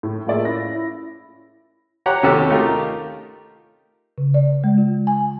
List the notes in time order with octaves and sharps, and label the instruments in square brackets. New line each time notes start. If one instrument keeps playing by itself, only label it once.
[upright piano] A2
A3 A#3 F4 G#4 D5 E5
C#4 E4 A#6
E4
[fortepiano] G4 C#5 F#5 A#5
D#2 C3 C#4 F#4 G4 A4
A3 D#4 F4 G4 A#4
[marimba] C#3
D5
G#3
F4
G#5